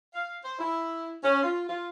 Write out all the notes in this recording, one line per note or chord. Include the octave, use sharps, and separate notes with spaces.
F5
C5
E4
C#4
F4
F4